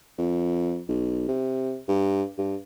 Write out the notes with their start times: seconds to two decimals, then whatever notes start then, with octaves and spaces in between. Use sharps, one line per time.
0.18 F2
0.88 B1
1.28 C3
1.88 G2
2.38 G2